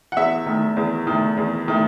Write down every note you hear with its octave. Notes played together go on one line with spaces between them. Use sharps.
F#5
E2 E5
D#3 A3
E2
D#3 A3
E2
D#3 A3